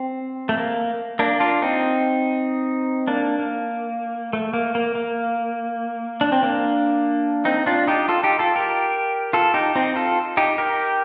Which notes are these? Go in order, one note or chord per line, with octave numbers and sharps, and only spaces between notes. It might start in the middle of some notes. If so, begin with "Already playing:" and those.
Already playing: C4
A3
A#3
A#3 D4
D4 F4
C4 D#4
A#3 D4
A#3
A3
A#3
A#3
A#3
D4
C4
A#3 D4
C4 D#4
D4 F4
D#4 G4
F4 A4
D#4 G4
F4 A4
G4 A#4
F4 A4
D#4 G4
C4 D#4
F4 A4
D#4 G4
G4 A#4